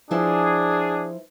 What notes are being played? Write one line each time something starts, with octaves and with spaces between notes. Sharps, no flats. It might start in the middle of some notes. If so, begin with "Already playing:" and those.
F3 D4 E4 G#4 C5